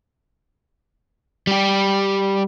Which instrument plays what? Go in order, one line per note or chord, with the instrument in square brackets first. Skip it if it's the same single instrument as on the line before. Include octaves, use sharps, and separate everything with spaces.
[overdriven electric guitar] G3 G4